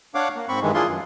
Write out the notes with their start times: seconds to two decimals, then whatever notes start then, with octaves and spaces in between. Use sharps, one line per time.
0.15 D4 C#5 F5 F#5 D6
0.35 A#3
0.49 G#2 C4 B5 C#6
0.62 G2 D#3 E3 G#3
0.74 D4 E4 F4 G#4 C6
0.87 F#2